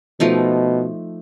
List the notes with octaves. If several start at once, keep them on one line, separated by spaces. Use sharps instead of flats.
B2 F3 A3 D#4